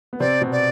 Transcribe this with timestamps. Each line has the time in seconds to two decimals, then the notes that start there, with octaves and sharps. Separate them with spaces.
0.13 B3
0.20 C3 C4 D5
0.41 B2 B3
0.52 D5